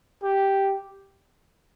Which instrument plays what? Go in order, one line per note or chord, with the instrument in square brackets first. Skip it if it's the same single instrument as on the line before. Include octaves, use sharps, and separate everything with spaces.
[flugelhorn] G4